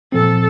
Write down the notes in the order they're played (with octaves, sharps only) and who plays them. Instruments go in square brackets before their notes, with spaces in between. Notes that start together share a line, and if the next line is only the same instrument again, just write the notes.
[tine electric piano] A#2 F3 C4 [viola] A4